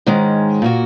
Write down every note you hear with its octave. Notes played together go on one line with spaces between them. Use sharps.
G#2 D#3 G#3 C#4
A#2 A#3 F#4